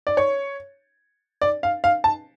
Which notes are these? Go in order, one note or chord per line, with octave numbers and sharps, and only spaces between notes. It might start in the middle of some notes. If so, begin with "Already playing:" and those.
D5
C#5
D5
F5
F5
A5